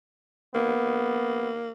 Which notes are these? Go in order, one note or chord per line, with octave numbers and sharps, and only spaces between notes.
A#3 B3